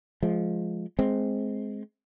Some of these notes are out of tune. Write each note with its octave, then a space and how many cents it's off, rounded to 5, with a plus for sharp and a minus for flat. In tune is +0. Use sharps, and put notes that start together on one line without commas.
F3 +0 G#3 +15
G#3 +15 C4 +0